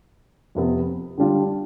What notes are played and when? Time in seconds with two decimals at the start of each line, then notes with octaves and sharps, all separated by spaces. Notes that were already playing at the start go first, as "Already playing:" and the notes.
0.55 F2 C3 F3 B3
1.17 D3 G3 D4 F4